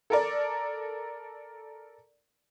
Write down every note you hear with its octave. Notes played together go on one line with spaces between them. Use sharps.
A4 A#4 D5